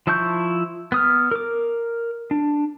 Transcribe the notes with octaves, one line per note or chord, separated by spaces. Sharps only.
F3 E4 A5 C#6 G6
B3 D#6 F6
A#4 D6
D4